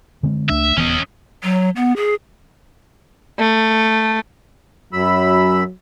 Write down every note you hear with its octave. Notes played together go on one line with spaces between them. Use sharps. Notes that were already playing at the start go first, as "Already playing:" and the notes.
D3 G#3 C4
C#2 A3 D4 E5
D#1 E3 B3 C#4 D#5
F#3
B3
G#4
A3
F#2 F#3 B5 E6